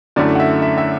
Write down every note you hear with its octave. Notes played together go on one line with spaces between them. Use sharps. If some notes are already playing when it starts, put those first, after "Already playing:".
F#2 D3 A3 E4 D5
F#5
E5
E5
E5